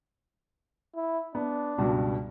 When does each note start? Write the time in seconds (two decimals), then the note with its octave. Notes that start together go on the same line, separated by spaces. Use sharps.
0.95 E4
1.35 B3 D4
1.78 C#2 G2 B2